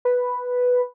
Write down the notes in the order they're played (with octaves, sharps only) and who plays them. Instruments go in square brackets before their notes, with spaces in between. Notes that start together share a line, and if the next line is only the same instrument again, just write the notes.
[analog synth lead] B4